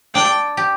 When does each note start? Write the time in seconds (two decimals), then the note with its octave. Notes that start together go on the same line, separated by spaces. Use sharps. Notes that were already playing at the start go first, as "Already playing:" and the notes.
0.15 D4 G5
0.57 G4